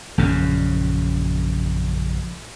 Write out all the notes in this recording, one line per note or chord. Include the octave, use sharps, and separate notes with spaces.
A#1 F#2 C#3